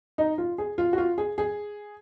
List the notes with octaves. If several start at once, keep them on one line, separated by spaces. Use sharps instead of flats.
D#4
F4
G#4
F4
F#4
F4
G#4
G#4